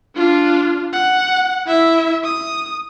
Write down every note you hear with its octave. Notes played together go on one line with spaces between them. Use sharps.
D4 F4
F#5
E4 E5
D#6